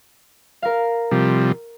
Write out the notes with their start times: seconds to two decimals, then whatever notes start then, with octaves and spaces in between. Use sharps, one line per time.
0.62 A#4 F5
1.12 C3 F3 G3